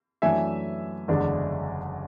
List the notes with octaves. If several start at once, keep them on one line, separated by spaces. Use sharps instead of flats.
F#2 E3 A3 D4 E5 G#5
F#1 E2 D3 G#3 D4